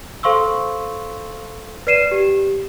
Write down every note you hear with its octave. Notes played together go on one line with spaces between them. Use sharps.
A4 C5 F5 C6 C#6 E6
B4 D5 C7 D#7 E7
G4